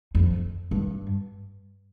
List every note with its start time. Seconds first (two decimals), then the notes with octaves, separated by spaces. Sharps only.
0.15 F2
0.71 G2